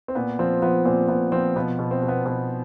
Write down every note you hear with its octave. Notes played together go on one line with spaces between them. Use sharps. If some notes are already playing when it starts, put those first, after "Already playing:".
C4
A#2 B3
F3 C4
F3 B3
A#2 C4
A#2 B3
F3 C4
B2 B3
B2
C4
B2
B3
B2 B3